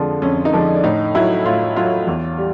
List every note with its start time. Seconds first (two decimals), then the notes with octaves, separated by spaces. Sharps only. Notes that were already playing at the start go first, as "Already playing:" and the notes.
Already playing: F2 D3 F3 G#3
0.22 F2 C#4
0.45 D#4
0.53 D3 F3 G#3 D4
0.75 D4
0.83 A2 D#4
1.15 F#3 E4
1.45 A2 F4
1.76 F#3 F4
2.07 E2
2.38 G3